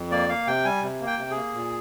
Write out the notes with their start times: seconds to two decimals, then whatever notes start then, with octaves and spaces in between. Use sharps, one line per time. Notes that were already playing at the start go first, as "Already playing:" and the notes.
Already playing: F2
0.11 A#3 D5
0.29 A#3 F5
0.47 C3 G5
0.65 G3 G#5
0.83 C3
1.00 A#3
1.07 G5
1.18 C3
1.31 G#4
1.36 A#3
1.54 A#2